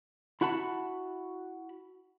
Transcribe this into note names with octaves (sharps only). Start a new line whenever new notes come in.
E4 F#4 F#5 A5 B5